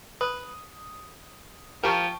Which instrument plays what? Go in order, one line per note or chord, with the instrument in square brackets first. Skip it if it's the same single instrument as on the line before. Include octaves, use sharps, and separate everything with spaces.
[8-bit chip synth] B4 [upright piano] D#6
[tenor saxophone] F3 [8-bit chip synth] G4 A#4 [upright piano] G5 A5 C#6